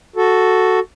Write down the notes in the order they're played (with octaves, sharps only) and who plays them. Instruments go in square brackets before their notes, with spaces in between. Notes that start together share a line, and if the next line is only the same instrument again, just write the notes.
[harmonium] F#4 A4